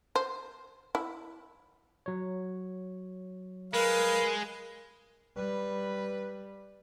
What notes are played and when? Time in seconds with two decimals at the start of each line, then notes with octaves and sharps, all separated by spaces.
0.16 C5
0.95 E4
2.06 F#3 C#5
3.74 G#3 A#4 B4 F5
5.37 G3 B4